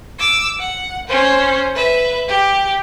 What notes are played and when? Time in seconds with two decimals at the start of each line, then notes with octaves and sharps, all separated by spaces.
0.19 D6 E6
0.59 F#5
1.07 C#4 C5
1.75 B4 E5
2.28 G4